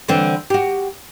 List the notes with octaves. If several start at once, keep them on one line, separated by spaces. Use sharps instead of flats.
D3 E3 C4
F#4 G4